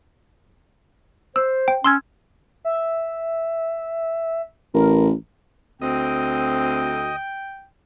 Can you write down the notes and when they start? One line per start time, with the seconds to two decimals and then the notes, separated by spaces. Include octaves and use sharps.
1.36 C5 E6
1.68 G5
1.84 C#4 C6 E6 G#6
2.65 E5
4.74 A1 A#4
5.82 D2 C4 D#5 G5